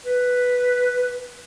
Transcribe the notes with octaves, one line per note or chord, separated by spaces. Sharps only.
B4